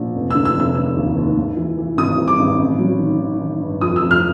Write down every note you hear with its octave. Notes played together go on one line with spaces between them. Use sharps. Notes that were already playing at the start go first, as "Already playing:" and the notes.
Already playing: A#1
F1
D3 E6
E6
F1
E6
D3 E6
D#2
D#2
G#2
E3
E3
G#1 D#6
G3
D6
G#1
A1
F#3
D#3
D#3
D#3
G2
F2 D#6
F2 E6
F6